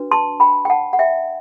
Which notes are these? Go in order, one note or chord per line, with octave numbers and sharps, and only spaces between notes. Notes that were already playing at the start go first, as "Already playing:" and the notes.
Already playing: D4 F#4 B4
A5 C6
G5 B5
G5
F#5 A5
F#5
E5 G5